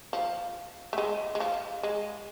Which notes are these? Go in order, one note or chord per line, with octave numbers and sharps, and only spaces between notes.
F3
A3
G#3
G#3
F3
G#3